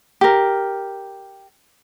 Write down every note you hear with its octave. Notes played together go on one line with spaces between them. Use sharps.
G4 A#4